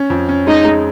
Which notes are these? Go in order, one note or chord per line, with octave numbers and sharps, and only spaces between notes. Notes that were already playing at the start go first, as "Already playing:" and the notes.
Already playing: C#4
F2
C#4
G#3 D#4
G#3